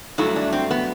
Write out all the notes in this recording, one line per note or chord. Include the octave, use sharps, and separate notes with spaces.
G2 F#3 A3 E4
D4
C4
B3